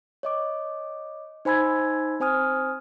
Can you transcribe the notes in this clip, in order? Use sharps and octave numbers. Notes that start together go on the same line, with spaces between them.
C#5 D#5 D6
D#4 C5 G#5 B5 E6 G#6
C4 C5 G#5 D#6 F6